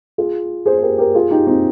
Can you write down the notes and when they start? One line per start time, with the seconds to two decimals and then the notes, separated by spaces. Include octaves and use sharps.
0.18 F4 G#4
0.66 G#4 C5
0.78 C5
0.82 G4 A#4
0.98 G4 A#4
1.14 F4 G#4
1.31 D#4 G4
1.47 C4 D#4